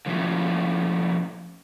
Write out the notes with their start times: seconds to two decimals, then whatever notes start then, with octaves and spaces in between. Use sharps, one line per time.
0.06 D3 F3 A3 A#3 C#4 E4